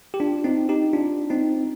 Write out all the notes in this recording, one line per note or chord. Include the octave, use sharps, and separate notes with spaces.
G4
D4 F4
C4 D#4
D#4 G4
D4 F4
C4 D#4